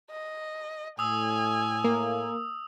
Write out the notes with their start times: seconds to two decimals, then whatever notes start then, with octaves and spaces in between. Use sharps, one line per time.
0.10 D#5
0.99 A2 G#5 D#6 E6
1.84 A#3